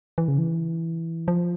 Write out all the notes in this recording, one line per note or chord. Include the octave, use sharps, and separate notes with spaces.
E3
C#3
E3
F3